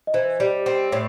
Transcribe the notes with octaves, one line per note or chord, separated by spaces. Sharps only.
D#5
E3 C5
G3
C4
A2